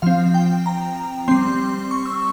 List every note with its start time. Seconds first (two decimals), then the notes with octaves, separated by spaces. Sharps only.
0.02 F3 C4 F5
0.34 G5
0.66 A#5
1.28 G3 C4 C6
1.91 C#6
2.06 E6